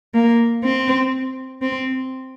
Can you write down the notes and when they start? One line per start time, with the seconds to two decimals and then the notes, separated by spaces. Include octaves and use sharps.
0.14 A#3
0.64 C4
1.62 C4